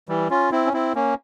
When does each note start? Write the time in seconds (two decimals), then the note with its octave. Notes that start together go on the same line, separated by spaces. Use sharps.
0.09 E3 G3
0.30 C#4 F4
0.52 C4 E4
0.66 C#4
0.73 C4 E4
0.95 A#3 C#4